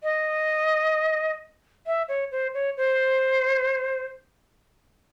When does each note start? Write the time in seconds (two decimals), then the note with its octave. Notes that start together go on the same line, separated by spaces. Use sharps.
0.03 D#5
1.87 E5
2.09 C#5
2.32 C5
2.54 C#5
2.77 C5